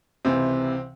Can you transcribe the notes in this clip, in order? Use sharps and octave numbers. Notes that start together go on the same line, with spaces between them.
C#2 C3 E3 C4